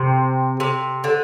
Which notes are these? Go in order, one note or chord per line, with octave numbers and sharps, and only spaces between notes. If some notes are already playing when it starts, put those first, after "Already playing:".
Already playing: C3
C3
D3